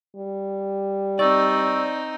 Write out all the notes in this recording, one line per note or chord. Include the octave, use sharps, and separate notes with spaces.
G3
C4 D#4 D5 C#6 E6